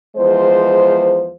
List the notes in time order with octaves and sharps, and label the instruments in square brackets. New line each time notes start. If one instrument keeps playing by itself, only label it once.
[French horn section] E2 F3 G#3 C5